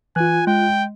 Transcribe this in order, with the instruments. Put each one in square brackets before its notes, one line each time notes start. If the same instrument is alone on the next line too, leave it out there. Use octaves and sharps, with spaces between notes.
[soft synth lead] E3 [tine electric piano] F4 F#6 [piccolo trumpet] G#5
[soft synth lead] G#3 [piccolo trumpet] G5